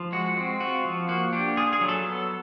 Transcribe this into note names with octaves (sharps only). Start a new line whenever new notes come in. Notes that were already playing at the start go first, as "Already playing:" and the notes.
Already playing: F3
G#3 F#4
C4
F4 F#4
F3
A#3 F#4
D4 G4
F4 G#4
G#4
F#3
A4
B3